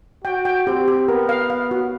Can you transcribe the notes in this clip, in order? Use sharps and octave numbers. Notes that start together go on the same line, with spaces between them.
F#4 G5
G5
C4 G4
G4
B3 A#4
F5
F5
F#4